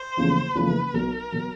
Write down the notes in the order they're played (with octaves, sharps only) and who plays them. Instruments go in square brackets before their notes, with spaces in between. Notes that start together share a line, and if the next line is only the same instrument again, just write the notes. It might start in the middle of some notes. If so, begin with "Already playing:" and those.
Already playing: [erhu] C5
[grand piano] F#1 E2 C#3 F3 A3
[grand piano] F#1 E2 C#3 F3 A3 [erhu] B4
[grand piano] B1 B2 F#3 [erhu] A#4
[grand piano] B2 F#3